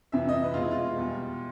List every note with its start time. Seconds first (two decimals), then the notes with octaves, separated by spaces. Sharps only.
0.12 F2 C3 E3 E5
0.29 D#5
0.33 E5
0.44 B4
0.54 B2 G#3 F4
0.63 E4
0.71 F4
0.95 E2 B2 G3